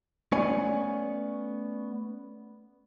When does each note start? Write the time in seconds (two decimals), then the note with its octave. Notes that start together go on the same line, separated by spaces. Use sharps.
0.32 A3 B3 C#4 C#5 D5 G#5